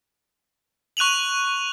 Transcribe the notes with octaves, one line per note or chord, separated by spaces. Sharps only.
C#6 F#6 D#7 F7 F#7